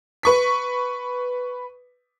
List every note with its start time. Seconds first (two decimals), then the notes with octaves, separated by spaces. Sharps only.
0.23 B4 C#6 B6